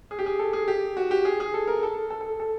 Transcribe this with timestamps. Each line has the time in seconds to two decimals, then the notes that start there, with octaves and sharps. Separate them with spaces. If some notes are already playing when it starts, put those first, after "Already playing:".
0.11 G#4
0.19 G4
0.26 G#4
0.39 A4
0.53 G#4
0.68 G4
0.97 F#4
1.11 G4
1.25 G#4
1.40 G#4
1.54 A4
1.67 A#4
1.83 A4
2.10 A4
2.21 A4
2.40 A4